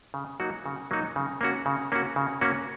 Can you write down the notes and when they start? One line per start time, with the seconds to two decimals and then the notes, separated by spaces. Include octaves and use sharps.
0.14 C#3
0.40 F#3 A#3 D#4 F#4
0.66 C#3
0.91 F#3 A#3 D#4 F#4
1.16 C#3
1.41 A#3 C#4 F#4
1.66 C#3
1.92 A#3 C#4 F#4
2.16 C#3
2.41 A#3 C#4 F#4